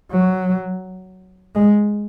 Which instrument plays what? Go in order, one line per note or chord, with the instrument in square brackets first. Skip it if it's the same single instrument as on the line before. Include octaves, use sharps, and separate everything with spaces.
[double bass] F#3
G#3